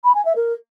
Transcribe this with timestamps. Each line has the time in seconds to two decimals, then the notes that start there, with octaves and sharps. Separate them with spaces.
0.04 B5
0.15 G#5
0.25 E5
0.36 A#4